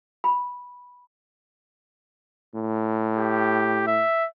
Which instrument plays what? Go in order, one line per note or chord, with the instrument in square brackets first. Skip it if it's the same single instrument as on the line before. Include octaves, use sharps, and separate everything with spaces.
[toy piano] B5
[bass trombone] A2
[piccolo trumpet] G4
E5